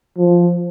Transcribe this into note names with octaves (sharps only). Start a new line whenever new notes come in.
F3